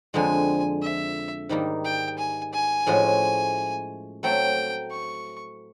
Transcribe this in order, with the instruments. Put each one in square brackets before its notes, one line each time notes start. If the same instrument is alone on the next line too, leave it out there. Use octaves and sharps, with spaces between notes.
[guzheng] F2 D3 F3 G#3 [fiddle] G#5
[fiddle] E5
[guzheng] G#2 D#3 G3 A#3 D#4
[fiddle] G5
G#5
G#5
[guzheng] A2 F3 G#3 C#4 F#4
[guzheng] F#3 A3 C4 [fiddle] G5
[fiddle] C#6